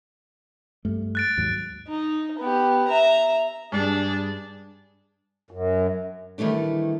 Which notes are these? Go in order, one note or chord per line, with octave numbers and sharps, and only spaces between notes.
G2 A3
F#6 A6 D7
D#2 G#2 F#3
D#4
B3 G4
E5 A#5
G2 D4 G#4
F#2
D#3 E3 G3 A3 D4